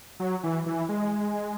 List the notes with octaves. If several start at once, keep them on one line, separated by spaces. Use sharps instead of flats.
F#3
E3
E3
G#3